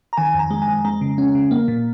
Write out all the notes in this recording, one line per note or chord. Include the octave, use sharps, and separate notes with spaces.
A#5
D#3 G#5
F2
A#5
G#3
G#5
F2
G#3 A#5
C#3
C#4
C#3
A#3
A#2